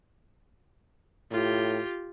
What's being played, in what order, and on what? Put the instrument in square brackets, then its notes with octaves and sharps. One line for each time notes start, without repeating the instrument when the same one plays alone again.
[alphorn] A2 [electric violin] F4 G4